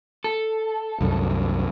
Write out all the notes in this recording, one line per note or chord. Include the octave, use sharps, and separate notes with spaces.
A4
C2 F#2